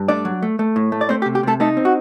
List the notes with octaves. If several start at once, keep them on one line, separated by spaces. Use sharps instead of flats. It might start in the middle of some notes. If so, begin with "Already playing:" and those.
Already playing: G2
A3 D4 D5
F#3
A3
A3
A2
A3
D5
A3 C4 C5
G4
C3
G4
C3 A3 A4
A3 D#4 A4
C4
F#4